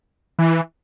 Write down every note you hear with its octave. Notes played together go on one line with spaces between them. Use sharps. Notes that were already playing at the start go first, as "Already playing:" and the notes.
E3